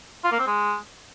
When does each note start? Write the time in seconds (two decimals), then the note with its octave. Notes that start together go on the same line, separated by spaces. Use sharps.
0.24 F4
0.32 A#3
0.39 C4
0.47 G#3